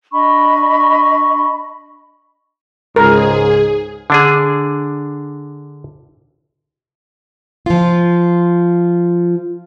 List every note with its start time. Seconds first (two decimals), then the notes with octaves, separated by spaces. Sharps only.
0.12 D4 D#5 B5 C#6
2.96 C#2 G#2 G#4 A#4
4.10 D3 D4 G#4
7.66 F3 F4